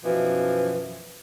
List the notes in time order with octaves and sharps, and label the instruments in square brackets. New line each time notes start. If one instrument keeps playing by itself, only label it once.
[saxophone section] F#2 B2 E3 F3